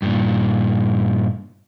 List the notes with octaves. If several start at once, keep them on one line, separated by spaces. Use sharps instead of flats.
G2 A#2